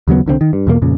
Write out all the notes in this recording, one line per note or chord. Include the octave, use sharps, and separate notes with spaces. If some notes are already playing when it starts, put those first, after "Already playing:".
D#2 C#3 F#3 B3
C2 D3 D#3 C4
D#3
G2
E2 B2 G3 A#3
F2 A#2 C#3